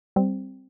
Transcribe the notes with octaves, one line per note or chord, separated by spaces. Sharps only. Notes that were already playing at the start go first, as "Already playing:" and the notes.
G3 C4